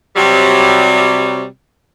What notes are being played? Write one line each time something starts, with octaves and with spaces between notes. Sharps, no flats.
C3 F#3 G3